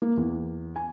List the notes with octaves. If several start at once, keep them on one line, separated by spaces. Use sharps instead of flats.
A#3
E2
G#5